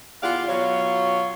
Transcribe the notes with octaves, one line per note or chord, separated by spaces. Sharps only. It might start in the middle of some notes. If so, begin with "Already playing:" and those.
E2 F4 G4 D5 F5 F#5
B2 F#3 F4 C#5